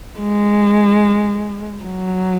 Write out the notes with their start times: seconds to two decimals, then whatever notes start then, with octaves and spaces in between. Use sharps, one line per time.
0.19 G#3
1.83 F#3